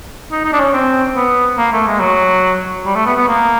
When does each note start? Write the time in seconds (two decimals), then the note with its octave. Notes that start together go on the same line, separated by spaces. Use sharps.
0.32 D#4
0.45 D#4
0.53 D4
0.60 C#4
0.73 C4
1.16 B3
1.58 A#3
1.72 A3
1.87 G#3
2.00 F#3
2.86 G3
2.95 A3
3.06 B3
3.16 B3
3.27 A#3